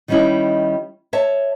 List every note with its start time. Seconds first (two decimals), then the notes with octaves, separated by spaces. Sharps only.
0.08 D#3 G3 C#4 D#4 E4
1.13 C#5 E5 A5